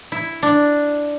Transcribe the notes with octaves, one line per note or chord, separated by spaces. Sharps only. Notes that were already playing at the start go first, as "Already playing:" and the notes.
E4
D4